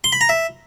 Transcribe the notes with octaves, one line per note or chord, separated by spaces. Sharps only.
C6
B5
A#5
E5